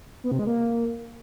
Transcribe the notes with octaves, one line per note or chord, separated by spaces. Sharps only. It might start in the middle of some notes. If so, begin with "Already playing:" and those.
B3
C3
G#3
A#3